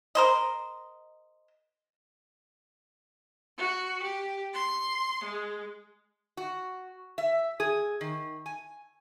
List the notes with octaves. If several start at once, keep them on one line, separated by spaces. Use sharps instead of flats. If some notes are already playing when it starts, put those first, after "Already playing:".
A#4 C5 D#5
F#4
G4
C6
G#3
F#4
E5
G#4
D#3
G#5